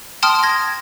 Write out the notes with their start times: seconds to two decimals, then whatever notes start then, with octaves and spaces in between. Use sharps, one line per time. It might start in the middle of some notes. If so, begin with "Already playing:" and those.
0.23 G5 A5 C6 D#6 F6
0.43 G#6 A#6